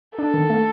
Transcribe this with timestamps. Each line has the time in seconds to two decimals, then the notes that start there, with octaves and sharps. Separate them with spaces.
0.18 D4 A4
0.34 D#3
0.50 A3